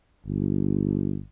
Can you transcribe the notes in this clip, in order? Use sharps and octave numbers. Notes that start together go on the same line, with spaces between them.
G1